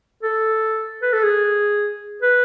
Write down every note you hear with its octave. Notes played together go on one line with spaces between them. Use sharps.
A4
B4
A4
G#4
B4